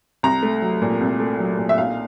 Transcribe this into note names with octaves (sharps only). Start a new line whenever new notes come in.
C2 A#5
A3
F#3
A#2
C2
A3
F#3
A#2
E5
B1 F5